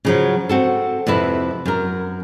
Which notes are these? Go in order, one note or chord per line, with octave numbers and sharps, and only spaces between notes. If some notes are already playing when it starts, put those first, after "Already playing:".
C#3 F3 F#3
C4 F#4 A4
F2 C3 E4 B4
F#2 A#4